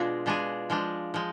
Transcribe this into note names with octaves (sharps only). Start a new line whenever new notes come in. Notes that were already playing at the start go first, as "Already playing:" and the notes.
Already playing: B2 G#3 D4 F4 G#4
B2 G#3 D4 G#4
F3 G#3 D4
F3 G#3